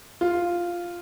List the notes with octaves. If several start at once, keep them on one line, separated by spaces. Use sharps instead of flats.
F4